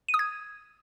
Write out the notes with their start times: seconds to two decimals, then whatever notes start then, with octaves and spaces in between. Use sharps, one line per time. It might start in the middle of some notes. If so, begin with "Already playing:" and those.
0.09 D#7
0.14 D#6
0.19 G#6